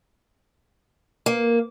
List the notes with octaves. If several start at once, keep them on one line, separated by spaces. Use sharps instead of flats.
A#3